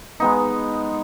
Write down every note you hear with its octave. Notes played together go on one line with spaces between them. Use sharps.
G#3 B3 D#4